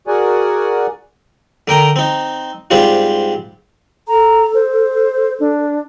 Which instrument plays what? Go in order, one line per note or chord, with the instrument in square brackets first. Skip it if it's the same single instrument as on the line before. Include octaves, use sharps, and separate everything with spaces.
[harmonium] F#4 G#4 A#4 D5 F#5 G#5
[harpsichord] D3 A#4 G5 A#5
C4 D#4
G#2 G3 C4 D4 F4
[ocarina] A4 [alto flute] A#5
[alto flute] C5
D4